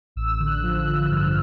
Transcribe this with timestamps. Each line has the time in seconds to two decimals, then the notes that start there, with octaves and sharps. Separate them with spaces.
0.16 A1 E6
0.40 D3
0.47 F#6
0.63 F3
0.79 F#6
0.86 D3
1.10 G2 F6